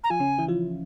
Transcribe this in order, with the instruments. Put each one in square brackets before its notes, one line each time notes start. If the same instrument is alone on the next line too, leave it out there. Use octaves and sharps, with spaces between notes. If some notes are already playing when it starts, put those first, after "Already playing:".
[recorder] A#5
[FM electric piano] F3 F4 [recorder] G#5
[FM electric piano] C#3 C#4
E3 E4
F3 F4